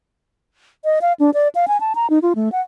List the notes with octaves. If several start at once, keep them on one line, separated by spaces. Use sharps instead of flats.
D#5
F5
D4
D5
F5
G#5
A5
A#5
D#4
F4
A3
F#5